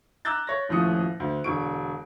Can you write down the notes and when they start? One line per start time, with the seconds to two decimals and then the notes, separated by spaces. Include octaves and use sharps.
0.25 A#5 D6 E6 F#6 G6 A6
0.47 C#5 A#6
0.69 D#1 A2 F3 C#4 D#6 C#7
1.20 D2
1.44 E1 D3 C#6 D7